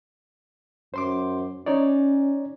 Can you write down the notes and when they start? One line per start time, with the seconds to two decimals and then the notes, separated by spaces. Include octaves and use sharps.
0.94 F#2 C5 C6 D6
1.66 C#4 D#4 C#5 D5